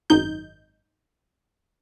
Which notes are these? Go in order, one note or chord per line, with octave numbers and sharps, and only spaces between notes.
G#1 F#2 D#4 G6